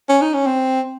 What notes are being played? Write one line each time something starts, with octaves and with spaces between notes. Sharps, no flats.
C#4
D#4
C#4
C4